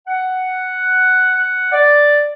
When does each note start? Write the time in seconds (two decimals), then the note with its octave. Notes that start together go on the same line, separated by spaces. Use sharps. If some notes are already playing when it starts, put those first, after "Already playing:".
0.07 F#5
1.72 D5